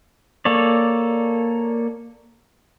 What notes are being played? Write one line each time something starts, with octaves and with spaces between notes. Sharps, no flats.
A#3 A4 C#5 D5